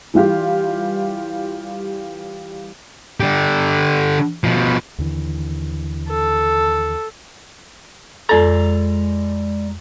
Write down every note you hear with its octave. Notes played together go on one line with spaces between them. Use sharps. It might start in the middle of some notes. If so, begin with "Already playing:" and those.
E3 G3 F4 G4
D3 G4
B2 F3
D#2 D3 E3
A4
F2 G#3 A4 D5 A#5